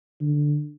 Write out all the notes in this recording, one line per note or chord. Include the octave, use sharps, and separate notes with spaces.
D3